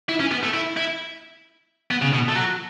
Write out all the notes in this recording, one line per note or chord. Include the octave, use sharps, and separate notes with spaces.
E4
C#4
B3
A3
E4
E4
B3
C#3
B2
A3
F#3